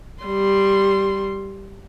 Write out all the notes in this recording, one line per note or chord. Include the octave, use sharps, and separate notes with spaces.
G3 C6